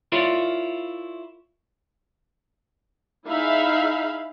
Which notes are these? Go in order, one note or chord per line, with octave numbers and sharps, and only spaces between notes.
E4 F4 A#4 C#5 D5 F5
D#4 E4 G#4 E5 F5 B5